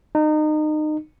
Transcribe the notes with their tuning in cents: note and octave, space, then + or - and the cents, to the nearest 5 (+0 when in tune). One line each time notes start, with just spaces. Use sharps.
D#4 -25